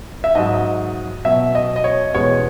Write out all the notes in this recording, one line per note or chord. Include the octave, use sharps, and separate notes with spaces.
E5
G#2 F#3 D#5
B2 F#3 E5
D#5
D#5
C#5
E2 B2 G#3 C#5